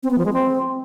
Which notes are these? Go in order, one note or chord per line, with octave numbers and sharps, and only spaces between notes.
C4
B3
F3
G#3
C4